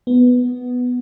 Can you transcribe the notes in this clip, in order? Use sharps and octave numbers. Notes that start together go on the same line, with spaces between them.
B3